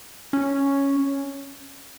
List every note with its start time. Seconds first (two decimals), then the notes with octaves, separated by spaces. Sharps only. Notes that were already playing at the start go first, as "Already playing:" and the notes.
0.33 C#4